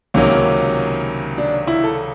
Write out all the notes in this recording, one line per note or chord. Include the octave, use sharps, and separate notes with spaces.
C#2 C3 D#3 F#3 A#3 C#4
D4
E4
A4